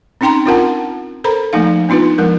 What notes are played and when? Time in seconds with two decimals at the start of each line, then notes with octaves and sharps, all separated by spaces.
0.21 C4 C#4 D#4 G5 A#5 C6
0.45 C4 D4 F4 A#4 F#5 A5
1.24 A4 A#4 C5 A#5 B5
1.53 F3 A3 A#3 D#4 F5
1.89 B3 D4 D#4 F4 B4
2.18 F3 G#3 A#4